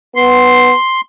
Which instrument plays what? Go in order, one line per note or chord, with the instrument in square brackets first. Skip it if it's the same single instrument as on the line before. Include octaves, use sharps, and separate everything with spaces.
[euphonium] B3 [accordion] C6